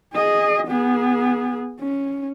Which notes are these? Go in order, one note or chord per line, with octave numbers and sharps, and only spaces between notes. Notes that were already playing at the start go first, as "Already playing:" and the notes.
G#4 D#5
B3 G#4
C#4